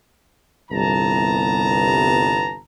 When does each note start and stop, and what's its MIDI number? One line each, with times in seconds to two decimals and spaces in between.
0.71 2.59 31
0.71 2.59 36
0.71 2.59 52
0.71 2.59 59
0.71 2.59 81
0.71 2.59 82